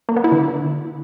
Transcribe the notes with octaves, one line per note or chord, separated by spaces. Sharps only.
A#3
B3
E4
D3